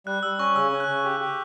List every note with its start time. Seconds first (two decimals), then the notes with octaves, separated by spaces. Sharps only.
0.07 G3 F#6
0.23 G3 E6
0.39 C#4 C#6
0.56 C#3 E6
0.72 C#4
0.80 F#6
0.88 C#3
1.04 G4
1.20 G4